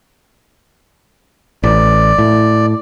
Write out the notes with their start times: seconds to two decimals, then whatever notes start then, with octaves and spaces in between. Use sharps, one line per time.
1.63 A1 D5
2.18 A2